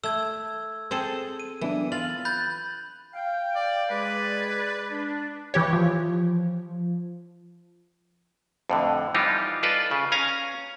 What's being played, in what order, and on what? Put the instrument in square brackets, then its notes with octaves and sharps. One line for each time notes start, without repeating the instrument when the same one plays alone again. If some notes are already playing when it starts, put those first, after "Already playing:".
[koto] A3 [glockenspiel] E6 G#6
[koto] C4 G#4 A4
[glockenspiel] D#7
[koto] E3 [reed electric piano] F#3 B3 D4
[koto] F4 [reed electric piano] A6 [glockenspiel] F#7
[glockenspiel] B5 G6 A6 [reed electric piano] F#6
[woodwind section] F5 G5
[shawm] D5
[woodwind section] G#3 G#4 D5 [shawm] B4
[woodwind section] D4
[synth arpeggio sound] E3 G4 C#5
[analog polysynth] F3
[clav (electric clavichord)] F2 A2 D3
E3 G3 D#4 F4 G4
F4 A4 B4 D5 D#5
C#3
C#4 F5 G#5 A#5